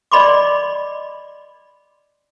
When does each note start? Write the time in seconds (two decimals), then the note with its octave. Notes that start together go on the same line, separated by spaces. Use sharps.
0.12 D5 D#5 B5 C6 D6